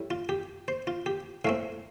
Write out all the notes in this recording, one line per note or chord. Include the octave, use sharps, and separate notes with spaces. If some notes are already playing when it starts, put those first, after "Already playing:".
Already playing: A2 G3
F4
G4
C5
F4
G4
A2 A3 C4 F5